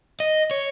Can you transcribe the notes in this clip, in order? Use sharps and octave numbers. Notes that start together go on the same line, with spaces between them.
D#5
C#5